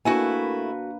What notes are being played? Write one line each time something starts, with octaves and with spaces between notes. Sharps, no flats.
A3 A#3 D4 E4 F#4 B4 G#5